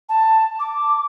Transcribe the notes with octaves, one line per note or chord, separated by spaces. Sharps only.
A5
D6